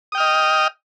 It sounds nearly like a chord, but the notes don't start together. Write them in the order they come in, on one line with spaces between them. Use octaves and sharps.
D#6 G5 F6 D#5